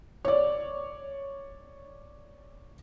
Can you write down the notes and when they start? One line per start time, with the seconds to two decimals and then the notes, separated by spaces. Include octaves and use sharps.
0.25 C#5 D5